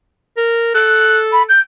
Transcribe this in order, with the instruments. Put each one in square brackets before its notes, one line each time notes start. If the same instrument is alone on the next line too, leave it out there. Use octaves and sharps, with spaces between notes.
[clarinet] A#4
[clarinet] A4 [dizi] F#6
[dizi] B5
G6